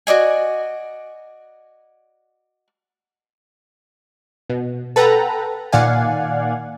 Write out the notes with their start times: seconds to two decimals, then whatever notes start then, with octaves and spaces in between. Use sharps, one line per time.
0.07 F#4 D5 D#5 G#5
4.49 B2
4.96 A4 B4 F#5 G5 A#5
5.72 A#2 D#3 D5 F5 F#5 G#5